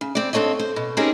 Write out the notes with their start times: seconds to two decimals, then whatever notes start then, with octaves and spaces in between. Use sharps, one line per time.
0.01 C#3
0.15 C4 D5
0.33 G2 C4 A4 C#5 D#5
0.59 C5
0.76 B2
0.97 C4 C#4 D#4 G4 G#4 A#4